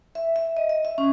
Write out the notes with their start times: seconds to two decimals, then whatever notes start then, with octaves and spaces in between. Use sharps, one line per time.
0.15 E5
0.36 E5
0.57 D#5
0.69 D#5
0.85 E5
0.98 C#4